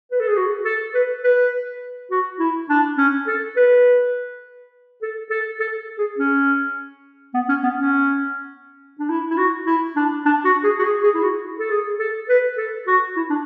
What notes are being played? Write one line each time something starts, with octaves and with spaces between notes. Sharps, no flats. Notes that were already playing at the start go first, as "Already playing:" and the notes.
B4
A4
G#4
F#4
A4
B4
B4
F#4
E4
D4
C#4
A4
B4
A4
A4
A4
G#4
C#4
B3
C#4
B3
C#4
D4
E4
E4
F#4
E4
D4
D4
F#4
G#4
F#4
G#4
G#4
E4
F#4
A4
G#4
A4
B4
A4
F#4
E4
D4